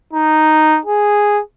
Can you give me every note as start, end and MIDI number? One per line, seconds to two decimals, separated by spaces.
0.13 0.79 63
0.86 1.40 68